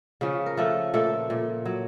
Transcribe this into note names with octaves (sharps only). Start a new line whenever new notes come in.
C#3 F3 C#4
A#4
F3 A3 A4
A#2 A3 A4
A#2
F#3